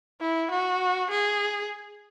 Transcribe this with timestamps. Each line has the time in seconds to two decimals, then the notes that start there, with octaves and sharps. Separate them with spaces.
0.21 E4
0.51 F#4
1.11 G#4